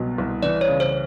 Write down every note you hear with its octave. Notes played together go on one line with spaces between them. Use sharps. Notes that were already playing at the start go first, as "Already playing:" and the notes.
Already playing: C2 B2 F#3
C2
E3 D5
C#5
C#3
C5